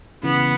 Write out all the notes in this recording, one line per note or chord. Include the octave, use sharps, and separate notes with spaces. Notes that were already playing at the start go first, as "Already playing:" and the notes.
C#3 E3 B3